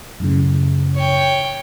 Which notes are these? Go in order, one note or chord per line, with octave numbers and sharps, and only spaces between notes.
F#2 A2 C#3
C#5 G5